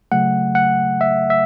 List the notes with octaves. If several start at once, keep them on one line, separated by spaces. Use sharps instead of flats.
C#3 F#3 A3 F#5
F#5
E5
E5